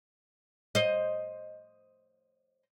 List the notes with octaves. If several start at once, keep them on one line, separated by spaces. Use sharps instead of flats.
C5 D#5